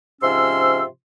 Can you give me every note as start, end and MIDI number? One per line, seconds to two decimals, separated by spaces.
0.22 0.83 44
0.22 0.83 48
0.22 0.83 53
0.22 0.83 61
0.22 0.83 84
0.22 0.83 88